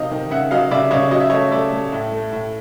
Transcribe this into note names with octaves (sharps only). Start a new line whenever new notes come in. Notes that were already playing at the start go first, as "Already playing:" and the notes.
Already playing: C3 D#3 F#3 D#5 F5
D#3
C#3 E5 F#5
F#3 D#5 F5
C#3 D5 E5
C#3 C#5 D#5
F#3 D#5
E5
A3 C#5 D#5
A3 D5 E5
A3
A2
A3
A2